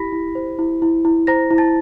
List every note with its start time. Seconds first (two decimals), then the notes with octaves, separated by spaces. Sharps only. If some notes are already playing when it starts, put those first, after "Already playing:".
Already playing: E4 G4 B5 A#6 B6
0.13 E4
0.35 C5
0.59 E4
0.82 E4
1.05 E4
1.27 C5 A#5 A#6
1.51 E4
1.58 A5 A6